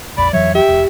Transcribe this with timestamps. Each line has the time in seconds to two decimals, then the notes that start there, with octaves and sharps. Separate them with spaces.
0.17 A#1 F2 D5 B5
0.33 F2 E3 F#3 C#5 E5
0.55 G4 E5 G5
0.68 E1